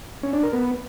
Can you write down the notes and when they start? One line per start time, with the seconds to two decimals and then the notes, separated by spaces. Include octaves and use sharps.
0.23 C#4
0.33 D4
0.43 A#4
0.53 B3